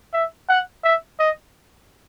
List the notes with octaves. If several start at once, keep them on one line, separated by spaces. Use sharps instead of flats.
E5
F#5
E5
D#5